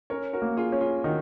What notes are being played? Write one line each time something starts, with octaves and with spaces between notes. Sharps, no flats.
C#4 A#4 C#5
F#4 A#4
A#3
F4 G#4
C#4
F4 G#4
D#3 D#4 F#4